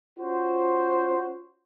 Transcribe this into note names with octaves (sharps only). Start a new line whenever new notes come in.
C#4 F4 F#4 C5